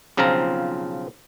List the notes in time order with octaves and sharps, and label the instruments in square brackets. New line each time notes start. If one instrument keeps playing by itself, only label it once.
[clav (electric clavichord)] B1 C#3 F3 C4 F4 A#5